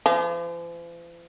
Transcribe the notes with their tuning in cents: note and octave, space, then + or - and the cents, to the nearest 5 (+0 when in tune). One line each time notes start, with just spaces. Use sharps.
F3 -45